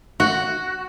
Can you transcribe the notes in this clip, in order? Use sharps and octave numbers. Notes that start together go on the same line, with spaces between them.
F#4